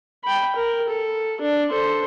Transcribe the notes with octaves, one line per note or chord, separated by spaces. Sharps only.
G5 B5
A#4
A4
D4
A4 C5